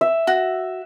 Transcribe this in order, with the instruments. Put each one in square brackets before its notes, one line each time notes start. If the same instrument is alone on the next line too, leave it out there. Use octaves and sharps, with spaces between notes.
[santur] E5
[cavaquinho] F#4